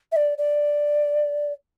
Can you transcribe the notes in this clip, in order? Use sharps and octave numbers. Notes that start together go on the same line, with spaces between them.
E5
D5
D5